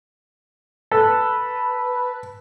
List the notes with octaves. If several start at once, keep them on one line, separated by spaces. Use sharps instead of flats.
A4 B4